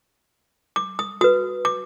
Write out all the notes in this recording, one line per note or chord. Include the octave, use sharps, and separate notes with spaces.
D6
D#6
F#4 B4 D#6
D6